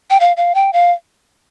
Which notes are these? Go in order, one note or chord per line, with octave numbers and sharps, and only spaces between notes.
G5
F5
F5
G5
F5